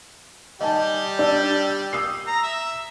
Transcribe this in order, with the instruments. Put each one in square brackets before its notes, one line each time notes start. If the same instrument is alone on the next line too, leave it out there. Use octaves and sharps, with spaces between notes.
[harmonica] G3 G4 [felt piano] D#5 G#5 A5
[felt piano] D4 D5 E6
D#6 E6 C7
[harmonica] A#5
E5